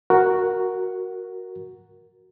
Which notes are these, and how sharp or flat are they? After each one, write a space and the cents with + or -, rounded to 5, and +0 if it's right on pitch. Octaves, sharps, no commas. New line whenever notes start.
F#4 +0 A#4 +0